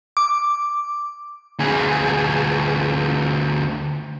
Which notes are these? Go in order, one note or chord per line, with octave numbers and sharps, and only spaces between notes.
D6
D2 G#4